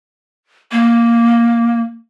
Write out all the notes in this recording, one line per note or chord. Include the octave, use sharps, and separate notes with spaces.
A#3